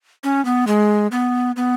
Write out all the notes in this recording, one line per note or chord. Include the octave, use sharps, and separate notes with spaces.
C#4
B3
G#3
B3
B3